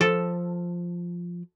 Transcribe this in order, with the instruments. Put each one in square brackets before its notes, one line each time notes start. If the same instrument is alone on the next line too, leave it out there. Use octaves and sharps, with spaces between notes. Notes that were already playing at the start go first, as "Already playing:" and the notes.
[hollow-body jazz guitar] F3 [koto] A4